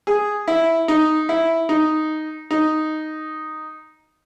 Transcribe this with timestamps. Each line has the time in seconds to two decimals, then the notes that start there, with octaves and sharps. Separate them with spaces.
0.07 G#4
0.48 E4
0.88 D#4
1.29 E4
1.69 D#4
2.51 D#4